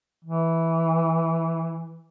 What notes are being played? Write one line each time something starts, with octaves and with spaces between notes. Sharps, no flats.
E3